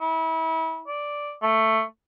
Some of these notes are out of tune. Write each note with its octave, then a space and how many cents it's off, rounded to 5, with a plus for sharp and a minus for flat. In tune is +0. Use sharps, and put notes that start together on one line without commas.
E4 -30
D5 -5
A3 +10